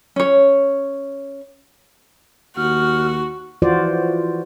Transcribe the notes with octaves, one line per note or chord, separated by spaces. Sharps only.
C#4 C#5
D#2 F#4 F6
E3 F3 F4 F#4 C5 D5